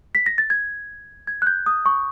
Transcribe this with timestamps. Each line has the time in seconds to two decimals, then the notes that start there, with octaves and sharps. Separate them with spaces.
0.15 B6
0.26 A#6
0.38 A6
0.50 G#6
1.27 G#6
1.42 F#6
1.47 G6
1.66 D#6
1.86 C#6